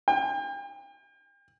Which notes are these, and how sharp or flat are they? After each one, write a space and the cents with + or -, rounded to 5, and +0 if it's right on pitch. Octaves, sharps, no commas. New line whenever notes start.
G5 +40